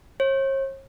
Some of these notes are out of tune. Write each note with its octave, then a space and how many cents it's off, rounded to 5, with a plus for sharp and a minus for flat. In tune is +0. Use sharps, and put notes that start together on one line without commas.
C#5 -45